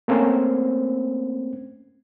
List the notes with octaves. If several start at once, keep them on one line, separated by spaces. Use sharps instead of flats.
A3 A#3 C4 C#4 C5